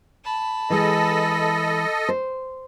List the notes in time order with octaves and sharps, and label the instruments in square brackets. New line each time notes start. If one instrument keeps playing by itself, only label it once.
[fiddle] A5 B5
[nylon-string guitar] E3 G#3 [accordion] A4 D#5
[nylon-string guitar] C5